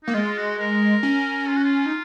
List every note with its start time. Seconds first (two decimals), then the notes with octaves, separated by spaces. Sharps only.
0.04 A#3 D#4
0.14 G#3 F4
0.37 F#4
0.58 A#4
1.03 C#4
1.48 F4
1.56 F#4
1.64 F4
1.86 D#4